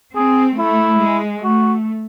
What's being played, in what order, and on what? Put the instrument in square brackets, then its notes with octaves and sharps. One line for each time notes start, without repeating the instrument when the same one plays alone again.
[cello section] C4 [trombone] G#4
[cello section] A3 [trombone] E4
[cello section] G#3
[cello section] A3 [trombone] F#4